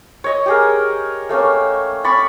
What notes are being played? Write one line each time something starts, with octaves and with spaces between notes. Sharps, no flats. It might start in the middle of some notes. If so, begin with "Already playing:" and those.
C#5 D#5
G4 G#4 A#4
A3 A#3 C#4
D5 B5 C#6